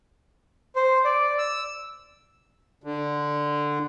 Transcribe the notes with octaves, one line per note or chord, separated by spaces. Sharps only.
C5
D5
E6
D3